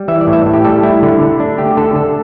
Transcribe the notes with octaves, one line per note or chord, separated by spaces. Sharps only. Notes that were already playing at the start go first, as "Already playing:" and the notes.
Already playing: G3
E3 E5
D5
A2
E5
A2
G4
G3 A4
A3 E4
D3
D3
D4
A3 G4
D3 A4
D3 A4